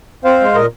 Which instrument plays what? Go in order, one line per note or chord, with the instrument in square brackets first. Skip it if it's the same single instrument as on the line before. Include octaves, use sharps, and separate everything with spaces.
[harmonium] C4 C5 F5
G#3
A#2 A#4 D#5